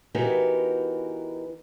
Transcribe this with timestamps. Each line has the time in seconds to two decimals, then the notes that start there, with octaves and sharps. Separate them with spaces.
0.15 E3 B3 D#4 F#4 G4 A#4